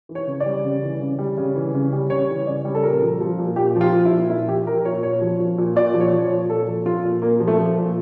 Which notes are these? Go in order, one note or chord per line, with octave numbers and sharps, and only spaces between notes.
E3
C#5
C#3
D5
G3
C#3
E3
C#3
G3
C#3
E3
C#3
G3
C#3 C#5
E3
C#3 D5
G3
A4
A#2 A#4
F3
F3
A#2
A#2 G4
F3
F4
F3
E4
A#2
A#2 E4
F3 G4
F3 A#4
A#2 C#5
A#2 C#5
F3
F3
A#2
A#2 D5
F3
C#5
F3
C#5
A#2
A#2 A4
F3
F3 F4
A#2
A#2 A#3
F3
A3
F3
A#2